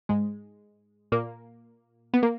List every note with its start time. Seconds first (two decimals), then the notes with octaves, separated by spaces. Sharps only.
0.09 G#2 G#3
1.12 A#2 A#3
2.14 B3
2.23 A#3